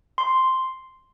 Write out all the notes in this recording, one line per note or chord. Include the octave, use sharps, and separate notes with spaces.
C6